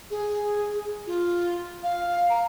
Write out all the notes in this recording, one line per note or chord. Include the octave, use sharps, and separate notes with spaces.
G#4
F4
F5
A#5